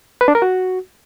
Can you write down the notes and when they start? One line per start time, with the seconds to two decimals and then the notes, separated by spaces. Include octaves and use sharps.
0.21 B4
0.28 D4
0.35 A#4
0.42 F#4